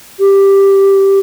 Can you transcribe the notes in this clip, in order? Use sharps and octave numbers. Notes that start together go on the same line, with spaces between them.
G4